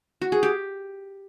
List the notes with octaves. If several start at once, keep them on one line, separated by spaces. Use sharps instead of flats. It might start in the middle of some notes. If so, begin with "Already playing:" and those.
F#4
G#4
G4